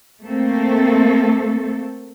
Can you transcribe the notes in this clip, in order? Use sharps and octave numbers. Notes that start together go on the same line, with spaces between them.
A3 A#3 C4 A4